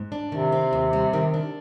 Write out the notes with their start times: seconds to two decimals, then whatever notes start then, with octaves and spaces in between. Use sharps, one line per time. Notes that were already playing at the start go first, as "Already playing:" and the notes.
Already playing: G#2
0.12 D4
0.32 C3 D#3
0.52 C4
0.73 D#2
0.93 G3
1.13 D#3
1.34 D4